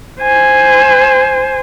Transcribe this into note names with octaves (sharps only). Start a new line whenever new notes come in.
C5 G#5